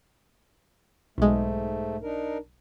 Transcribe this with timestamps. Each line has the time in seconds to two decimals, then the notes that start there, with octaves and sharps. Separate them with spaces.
1.18 B1 G#2 G#3 A3
2.02 D4 D#4 A#4